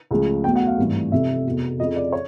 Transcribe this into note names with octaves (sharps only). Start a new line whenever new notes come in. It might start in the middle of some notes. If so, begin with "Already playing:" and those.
C#2 C#3 F3 A3
E2 B2 F#3 A3 G5
F#5
F5
G#1 G2 E3 A3
F1 F2 C3 E5
F1 E2 B2
F2 C#3 F3 D#5
D5
C#5